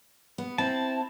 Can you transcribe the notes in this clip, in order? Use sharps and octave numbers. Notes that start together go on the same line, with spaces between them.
B3
C4 E4 A5